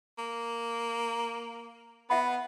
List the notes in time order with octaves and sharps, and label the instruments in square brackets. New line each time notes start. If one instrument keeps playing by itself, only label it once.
[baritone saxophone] A#3
[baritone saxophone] B3 [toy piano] E5 F#5 B5